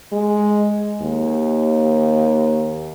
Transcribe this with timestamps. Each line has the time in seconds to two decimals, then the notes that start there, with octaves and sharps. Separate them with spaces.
0.12 G#3
1.02 D#2